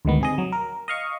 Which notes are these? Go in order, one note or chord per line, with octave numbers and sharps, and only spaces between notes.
D2 G#2 D#3 B3
C3 G#4 D#5
F#3
A#4
D#5 F5 C#6